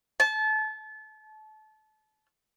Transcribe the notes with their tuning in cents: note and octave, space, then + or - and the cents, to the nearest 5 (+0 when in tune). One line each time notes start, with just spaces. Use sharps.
A5 -30